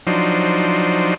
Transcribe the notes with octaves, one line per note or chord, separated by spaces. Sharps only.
F3 F#3 D4 D#4 C5